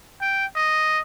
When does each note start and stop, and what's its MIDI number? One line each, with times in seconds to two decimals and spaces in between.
0.21 0.45 79
0.56 1.00 75